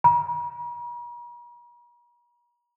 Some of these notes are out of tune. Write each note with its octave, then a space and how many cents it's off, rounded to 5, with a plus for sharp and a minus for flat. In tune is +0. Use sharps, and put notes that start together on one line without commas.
A#5 +45